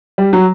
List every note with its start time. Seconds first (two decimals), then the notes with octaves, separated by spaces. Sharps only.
0.18 G3
0.33 F#3